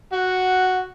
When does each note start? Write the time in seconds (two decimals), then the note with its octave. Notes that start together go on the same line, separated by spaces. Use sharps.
0.13 F#4 F#5